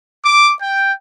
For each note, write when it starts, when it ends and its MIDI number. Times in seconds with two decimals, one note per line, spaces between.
0.25 0.53 86
0.62 0.92 79